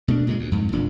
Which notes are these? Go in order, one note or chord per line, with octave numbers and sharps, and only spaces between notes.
B2 A3 B3 D4
A#2 C#3 G#3
D2
F2 G#2
E1 A#2 D4